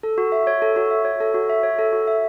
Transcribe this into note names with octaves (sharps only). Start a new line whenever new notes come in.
A4
F#4
E5
C#5
A4
F#4
E5
C#5
A4
F#4
E5
C#5
A4
F#4
E5